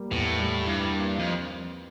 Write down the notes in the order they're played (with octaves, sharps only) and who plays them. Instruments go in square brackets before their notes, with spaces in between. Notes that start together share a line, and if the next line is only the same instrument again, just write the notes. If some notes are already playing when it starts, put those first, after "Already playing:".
Already playing: [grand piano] G3 A#3
[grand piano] E2 [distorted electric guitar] A2
[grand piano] G3
[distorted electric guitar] G2 [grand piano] E4
[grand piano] A#3
[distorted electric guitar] F2 [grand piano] C4